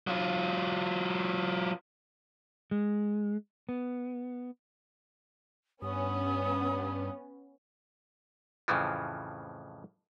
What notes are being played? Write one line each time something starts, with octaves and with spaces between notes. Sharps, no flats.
F#3 F4
G#3
B3
G2 B3 C#4 D#6
F2 A2 C#3 E3 F3